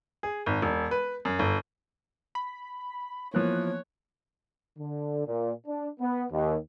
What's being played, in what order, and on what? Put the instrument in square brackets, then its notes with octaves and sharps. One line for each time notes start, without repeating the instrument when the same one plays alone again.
[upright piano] G#4
G#1
E1
B4
F#2
G1
[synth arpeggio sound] B5
[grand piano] E3 F3 [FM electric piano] A#3 B3 F#6 [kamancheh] C#5
[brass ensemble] D3
A#2
D4
B3
D#2